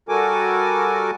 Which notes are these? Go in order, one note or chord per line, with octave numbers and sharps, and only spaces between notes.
G3 F#4 A4 A#4 G#5 D6